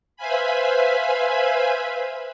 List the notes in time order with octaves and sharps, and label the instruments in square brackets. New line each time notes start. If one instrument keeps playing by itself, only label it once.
[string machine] B4 C5 E5 F5 G#5 B5